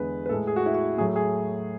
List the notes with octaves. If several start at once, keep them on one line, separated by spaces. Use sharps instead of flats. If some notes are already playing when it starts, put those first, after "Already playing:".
Already playing: E2 D3 G#3 B4
B4
A2 G#3 A4
G#4
F#4
E4
F#4
A2 F#3 A3 G#4
G#4